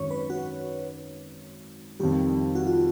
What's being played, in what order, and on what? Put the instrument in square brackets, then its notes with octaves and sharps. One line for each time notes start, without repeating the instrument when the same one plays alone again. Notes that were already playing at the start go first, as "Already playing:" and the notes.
Already playing: [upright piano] G#1 F#2 D#3 [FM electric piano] C#5
[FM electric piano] B4
F#4
[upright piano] F2 C3 D#3 G3 [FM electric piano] G4
[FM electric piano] F#4
F4